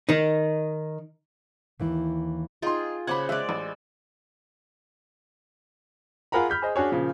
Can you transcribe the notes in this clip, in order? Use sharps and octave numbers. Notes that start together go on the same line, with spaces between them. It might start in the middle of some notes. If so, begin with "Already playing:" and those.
D#3 D#4
D#2 E3 E4
D#4 F4 G#4 G5 C6
C#3 C5 F#5 B5 D6 G#6
G#3 D5 E5 F#6
A1
F4 G#4 A#4 F#5 A#5 B5
B5 F6 G6 B6
G#4 C5 D#5
D4 F#4 G#4 C#5
A#2 C#3 F3